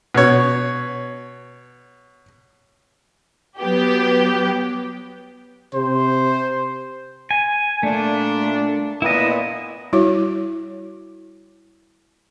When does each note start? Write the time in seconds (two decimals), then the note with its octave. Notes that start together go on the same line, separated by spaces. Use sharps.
0.15 B2 C#5
3.60 F#3 B3 G4
5.74 C3 C5
7.31 G#5
7.83 A#2 A3 D4
9.02 A#2 B3 E4 D#5
9.93 G3 E4 F#4 C#5 D6